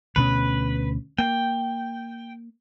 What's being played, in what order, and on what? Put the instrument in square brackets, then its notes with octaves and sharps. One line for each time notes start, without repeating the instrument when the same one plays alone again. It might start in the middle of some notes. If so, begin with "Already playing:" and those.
[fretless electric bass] D2 B2 C#4 [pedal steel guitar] B4
[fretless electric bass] A#3 [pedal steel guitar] G5